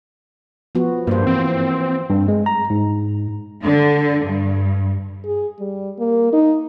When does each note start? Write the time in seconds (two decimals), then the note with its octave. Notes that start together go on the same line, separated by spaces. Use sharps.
0.75 F3 B3 F#4
1.07 G2 A#3 C5
1.27 E3 C4
2.10 G2
2.28 G#3
2.46 A#5
2.70 G#2
3.62 D3
4.24 G2
5.25 G#4
5.59 G3
5.99 A#3
6.33 D#4